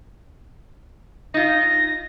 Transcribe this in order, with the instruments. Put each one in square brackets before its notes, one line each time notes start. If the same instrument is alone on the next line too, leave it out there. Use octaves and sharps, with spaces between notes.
[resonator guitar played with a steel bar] D#4 F4 [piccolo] A#6